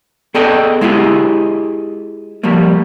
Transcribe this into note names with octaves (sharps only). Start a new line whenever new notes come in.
B3 G#4 A4 D5 D#5 G5
G#3 E4 F4 G4 G#4
F3 G3 A3 A#3